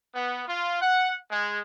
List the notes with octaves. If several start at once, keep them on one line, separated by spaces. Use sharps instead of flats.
B3
F4
F#5
G#3